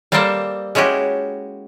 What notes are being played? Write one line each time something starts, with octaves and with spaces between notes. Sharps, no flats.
G3 A#3 C4 A4 C5 G5
G#3 C#4 E4 F#4 G4